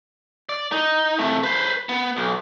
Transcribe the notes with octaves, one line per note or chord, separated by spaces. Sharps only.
D5
D#4
C3 A3
B4 C5
B3
B1